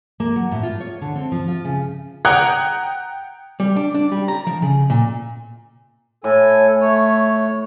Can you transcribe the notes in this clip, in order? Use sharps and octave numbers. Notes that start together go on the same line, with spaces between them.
A#3
F#3
A2
F4
C#5
D3
C4
F3
F4
C#3
F#5 G5 A#5 D#6 F#6 G#6
G3
D4
D4
G3
A#5
F3
C#3
A#2
A2 A4 G#5
A3 C#5